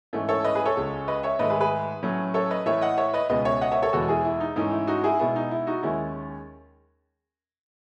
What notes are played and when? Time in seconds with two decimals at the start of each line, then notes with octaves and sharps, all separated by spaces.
0.13 G#2 E3 A3 C#4
0.29 A4 C#5
0.44 B4 D#5
0.55 G#4 B4
0.66 A4 C#5
0.76 C#2 C#3 G#3
1.08 B4 D#5
1.23 C#5 E5
1.39 G#2 D#3 A3 B4 D#5
1.50 G#4 B4
1.60 G#4 B4
2.03 A2 F#3 A3 C#4
2.34 A4 C#5
2.50 B4 D#5
2.66 A2 E3 A3 C#5 E5
2.81 D#5 F#5
2.98 C#5 E5
3.13 B4 D#5
3.29 C#2 B2 G#3 B3 B4 D#5
3.45 C#5 E5
3.61 D#5 F#5
3.72 C#5 E5
3.83 A4 C#5
3.93 E2 B2 G#3 B3 F#4 A4
4.09 E4 G#4
4.25 E4
4.40 D#4
4.56 G#2 E3 A3 C#4 D#4
4.72 E4
4.87 D#4 F#4
5.04 E4 G#4
5.19 B2 G#3 B3 E4
5.36 D#4
5.51 E4
5.67 D#4 F#4
5.83 D#2 D#3 G#3 C#4 E4